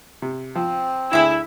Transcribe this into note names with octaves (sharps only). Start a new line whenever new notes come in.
C3
F3 C4
D2 E4 G#4 E5 B5